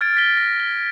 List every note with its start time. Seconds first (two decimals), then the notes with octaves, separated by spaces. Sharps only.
0.01 F6 G#6 A6 D7
0.17 B6 G7
0.37 A#6
0.60 G7